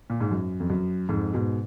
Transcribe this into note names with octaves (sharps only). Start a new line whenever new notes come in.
A#2
G#2
F#2
F2
F#2
F2 G#2
G#2 B2